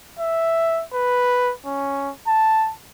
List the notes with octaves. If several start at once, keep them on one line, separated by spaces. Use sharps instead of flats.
E5
B4
C#4
A5